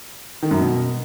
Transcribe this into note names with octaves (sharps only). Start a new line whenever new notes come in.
D#3
F#2
B2